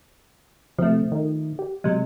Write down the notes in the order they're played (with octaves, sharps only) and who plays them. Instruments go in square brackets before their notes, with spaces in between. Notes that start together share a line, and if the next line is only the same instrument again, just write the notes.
[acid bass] C3 [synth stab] F3 A3
[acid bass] D#3
G4
[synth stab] C3 F#3 G#3